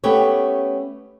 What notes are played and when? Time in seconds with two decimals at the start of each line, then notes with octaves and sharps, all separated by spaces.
0.04 A3 B3 C#4 G4 C#5